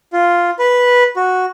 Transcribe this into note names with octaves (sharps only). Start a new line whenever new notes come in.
F4
B4
F#4